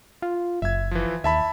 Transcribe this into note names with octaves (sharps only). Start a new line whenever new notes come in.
F4
F#1 E5 G#6
E3 F3
D#2 E5 A5 B5